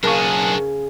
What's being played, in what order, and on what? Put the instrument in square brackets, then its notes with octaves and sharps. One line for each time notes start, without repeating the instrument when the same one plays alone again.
[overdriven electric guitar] B1 G#4 [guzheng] C#3 [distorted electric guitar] D4 F#4 [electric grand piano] A#4 A5 C#6